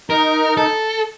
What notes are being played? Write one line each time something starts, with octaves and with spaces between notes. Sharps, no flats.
D#4 A#4
A4